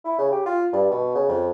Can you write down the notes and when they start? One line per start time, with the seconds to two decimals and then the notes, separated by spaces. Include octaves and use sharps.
0.05 E4
0.18 C#3
0.32 G4
0.46 F4
0.73 G2
0.91 B2
1.15 C#3
1.29 F2